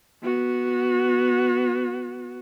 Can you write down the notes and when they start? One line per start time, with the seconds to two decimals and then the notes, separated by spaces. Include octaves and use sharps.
0.23 B3 F#4